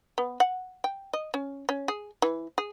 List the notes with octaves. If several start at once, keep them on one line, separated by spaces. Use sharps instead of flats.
B3
F#5
G5
D#5
C#4
C#4
G#4
E3
G#4